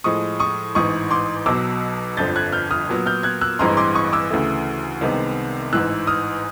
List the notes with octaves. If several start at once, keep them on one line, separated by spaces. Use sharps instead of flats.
A2 F3 G#3 C#6 D#6
C#6 D#6
A1 G#2 E3 C#6 D#6
C6 D6
B1 B2 F#3 D6 E6
G1 F2 D3 F3 G6 A6
F#6 G#6
F6 G6
D#6 F6
A#2 F#3 B3
F6 G6
F#6 G#6
E6 F#6
A1 G2 E3 G#3 C4 A#5 C6
C6 D6
C#6 D#6
D6 E6
D2 C#3 E3 A3
C2 C3 D#3 G#3 B3
A1 G#2 E3 E6 F#6
D#6 F6